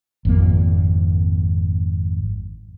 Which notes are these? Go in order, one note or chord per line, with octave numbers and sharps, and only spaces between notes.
G#1 F2 A#3